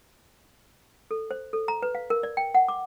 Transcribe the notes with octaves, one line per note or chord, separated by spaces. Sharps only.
A4
C5
A4
A#5
B4
F5
A#4
D5
G5
F#5
D6